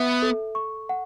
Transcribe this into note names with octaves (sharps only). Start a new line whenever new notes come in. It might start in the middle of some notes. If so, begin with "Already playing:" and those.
Already playing: B3 E5
A4
C#6
F#5